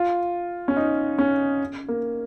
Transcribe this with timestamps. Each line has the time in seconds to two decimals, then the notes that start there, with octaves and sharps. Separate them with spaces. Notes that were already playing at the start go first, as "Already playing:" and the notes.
Already playing: F4
0.68 C#4
0.77 D#4
1.18 C#4
1.89 A#3